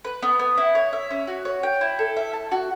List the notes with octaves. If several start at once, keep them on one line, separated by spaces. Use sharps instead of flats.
B4
B3
B3
E4
C#5
E5
C#4
F#4
C#5
G5
E4
A4
E5
A5
F#4